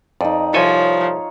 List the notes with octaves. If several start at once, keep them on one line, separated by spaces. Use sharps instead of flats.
F2 D#4 D5
C2 F3 A4 C#5 G#5 C#6